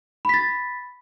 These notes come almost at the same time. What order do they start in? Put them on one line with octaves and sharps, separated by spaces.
B5 B6 A6